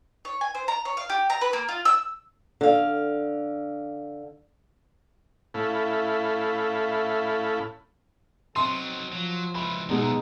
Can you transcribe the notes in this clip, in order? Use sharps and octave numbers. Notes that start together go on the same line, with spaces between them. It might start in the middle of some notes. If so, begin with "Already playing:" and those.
C#5
G#5
C5
A#5
C#5
F5
G4
A#5
B4
A#3
F4
E6
D3 F5
A2 C#4 E4 A4 F5 B5
F#3 C4 D#4 C6
F3 F#3
C#2 E3 B5
B1 B2 E3 G#3 B3 D#4